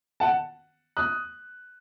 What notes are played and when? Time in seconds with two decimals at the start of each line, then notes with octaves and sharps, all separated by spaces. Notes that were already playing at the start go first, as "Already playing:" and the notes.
0.20 F#5 A5
0.97 D#6 F#6